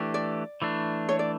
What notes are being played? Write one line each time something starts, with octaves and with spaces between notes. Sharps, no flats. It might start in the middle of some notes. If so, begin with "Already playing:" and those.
Already playing: E3 A3 D4 G4
D5
E3 A3 D4
C#5
D5